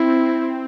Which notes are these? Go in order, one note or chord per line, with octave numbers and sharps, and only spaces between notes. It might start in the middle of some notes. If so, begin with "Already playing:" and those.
Already playing: C4 E4